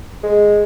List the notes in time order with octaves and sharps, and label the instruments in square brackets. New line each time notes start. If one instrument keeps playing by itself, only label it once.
[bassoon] G#3